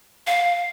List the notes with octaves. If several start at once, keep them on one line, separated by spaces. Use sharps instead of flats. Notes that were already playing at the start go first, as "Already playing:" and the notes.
F5